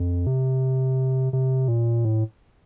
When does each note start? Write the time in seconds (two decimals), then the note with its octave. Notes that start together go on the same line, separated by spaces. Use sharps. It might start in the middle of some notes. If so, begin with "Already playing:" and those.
Already playing: F2
0.27 C3
1.33 C3
1.68 A#2
2.05 A2